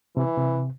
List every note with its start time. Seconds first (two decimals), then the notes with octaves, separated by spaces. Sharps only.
0.17 C3 E3
0.38 C3